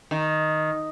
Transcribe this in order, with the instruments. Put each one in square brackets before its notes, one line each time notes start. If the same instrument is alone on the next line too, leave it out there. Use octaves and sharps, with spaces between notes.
[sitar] D#3